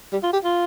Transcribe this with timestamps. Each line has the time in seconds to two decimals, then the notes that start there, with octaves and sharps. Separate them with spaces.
0.13 G3
0.23 F4
0.33 G4
0.44 F4